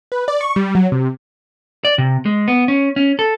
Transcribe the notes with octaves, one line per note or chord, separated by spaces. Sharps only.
B4
D5
C#6
G3
F#3
C3
D5
C3
G#3
B3
C#4
C#4
A4